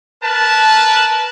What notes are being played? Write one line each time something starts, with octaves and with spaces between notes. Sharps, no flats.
A#4 B4 A5